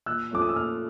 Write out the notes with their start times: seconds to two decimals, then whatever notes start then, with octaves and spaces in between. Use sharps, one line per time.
0.06 A#2 E6 F#6
0.31 F3 A3 C#4 D6
0.42 D#6
0.49 E6
0.55 A#2 D#6 F6